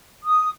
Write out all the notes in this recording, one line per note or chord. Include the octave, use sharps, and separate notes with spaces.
D#6